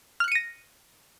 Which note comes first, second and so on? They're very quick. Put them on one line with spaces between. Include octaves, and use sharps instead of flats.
F6 F#6 C#7 D#7 A#6